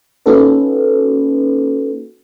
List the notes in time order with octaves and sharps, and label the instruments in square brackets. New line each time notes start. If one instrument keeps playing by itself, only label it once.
[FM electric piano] A#3 C#4 D#4 F#4 A4 B4